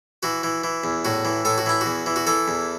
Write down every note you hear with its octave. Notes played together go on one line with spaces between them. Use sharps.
E3 F#4
E3
E3
E2
A2 F#4
E3
A2 A4
F#4
E3 E4
F#4
E2
E3
F#4
E3 A4
E2